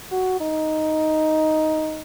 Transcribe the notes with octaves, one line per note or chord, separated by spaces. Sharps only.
F#4
D#4